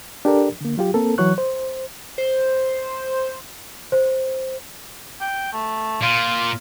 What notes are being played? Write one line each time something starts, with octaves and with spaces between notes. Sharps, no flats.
D4 G4 A4 A#4 D5
D3 A#3
F#3 F4 G4
A#3 C4 A4 A#4
E3 F#3 C#5 C#6 F#6
C5
C5
C5
G5
A3
A#2 F4